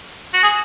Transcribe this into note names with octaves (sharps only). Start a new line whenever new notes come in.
F#4
G#4